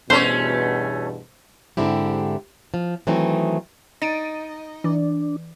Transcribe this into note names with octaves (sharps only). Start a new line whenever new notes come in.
E2 G2 B2 A3 C#4 C5
G#2 D3 C4 E4 G4
F3
D#3 E3 F#3 A3 C4 D#4
D#4 A6 D7 D#7
E3 D4 D5